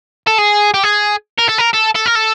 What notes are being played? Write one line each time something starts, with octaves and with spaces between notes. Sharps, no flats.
A4
G#4
G4
G#4
A#4
A4
A#4
A4
A4
A#4
A4